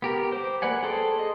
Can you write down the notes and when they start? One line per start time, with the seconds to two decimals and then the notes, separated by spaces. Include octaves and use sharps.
0.02 B3 G4 A#4
0.32 C5 D6
0.62 A#3 B4 D5 F#5 G#5
0.83 G#4 A4 C5 G5
1.19 D#5